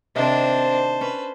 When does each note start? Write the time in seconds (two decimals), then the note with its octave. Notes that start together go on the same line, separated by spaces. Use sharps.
0.16 C3 D#3 C4 D4 C5 A5
1.01 C#4 B4